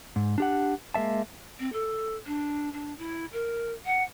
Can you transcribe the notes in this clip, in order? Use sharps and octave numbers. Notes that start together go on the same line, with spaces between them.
G#2
D4 G4 F#5
G#3 A#3 E5 A5
C4
A4
D4
D4
E4
A#4
F#5